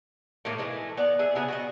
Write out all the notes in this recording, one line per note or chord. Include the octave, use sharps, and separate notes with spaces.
A2 D#3 A3 A#3
E3 G#3 A3
B3 D5
G#4 E5
C#3 B3 G#4
F#4 G#4 D#5